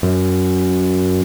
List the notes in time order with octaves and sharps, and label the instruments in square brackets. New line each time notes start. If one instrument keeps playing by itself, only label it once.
[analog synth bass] F#2